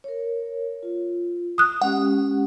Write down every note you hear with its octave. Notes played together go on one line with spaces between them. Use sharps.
A#4 C#5
F4
D#6 F#6
G#3 C#4 G4 F#5